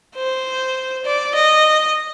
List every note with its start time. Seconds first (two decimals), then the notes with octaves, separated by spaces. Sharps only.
0.16 C5
1.05 D5
1.35 D#5